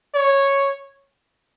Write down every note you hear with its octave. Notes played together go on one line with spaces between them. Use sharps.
C#5